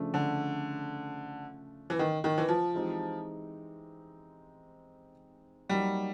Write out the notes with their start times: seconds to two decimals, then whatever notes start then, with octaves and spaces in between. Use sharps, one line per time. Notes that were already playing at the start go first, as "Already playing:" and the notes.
Already playing: C#3 F3 A3 D4
0.14 D3
1.90 E3
1.99 D#3
2.24 D#3
2.38 E3
2.48 F3
2.74 E3 G#3 C4 D#4 G4
5.69 F#3 G3 A#3 D#4 G4